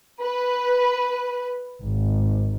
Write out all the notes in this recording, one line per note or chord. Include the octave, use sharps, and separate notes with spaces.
B4
G#1